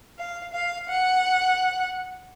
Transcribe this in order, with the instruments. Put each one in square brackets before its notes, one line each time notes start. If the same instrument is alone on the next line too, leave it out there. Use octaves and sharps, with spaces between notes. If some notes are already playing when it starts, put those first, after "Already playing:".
[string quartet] F5
F5
F#5